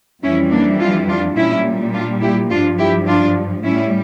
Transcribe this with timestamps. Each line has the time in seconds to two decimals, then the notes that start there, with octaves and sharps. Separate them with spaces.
0.23 F2 E3 G3 C#4 E4
0.51 A#3 D4
0.79 D4 F4
1.08 D4 F4
1.36 A#2 G3 C#4 E4
1.93 D4 F4
2.21 E4 G4
2.50 F3 D4 F4
2.54 G2
2.78 E4 G4
3.06 D4 F4
3.63 A2 G3 C#4 E4